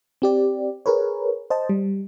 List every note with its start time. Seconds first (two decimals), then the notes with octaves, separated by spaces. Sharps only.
0.22 C4 G4 D5
0.86 G#4 A#4 B4 C#5
1.50 C5 D#5 A5
1.69 G3